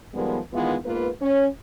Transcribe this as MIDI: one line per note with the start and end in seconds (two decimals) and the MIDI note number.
0.14 0.39 51
0.14 0.39 53
0.14 0.39 55
0.14 0.39 56
0.14 0.39 59
0.53 0.76 47
0.53 0.76 51
0.53 0.76 52
0.53 0.76 56
0.53 0.76 59
0.53 0.76 65
0.85 1.08 44
0.85 1.08 58
0.85 1.08 59
0.85 1.08 65
0.85 1.08 71
1.21 1.46 61
1.21 1.46 73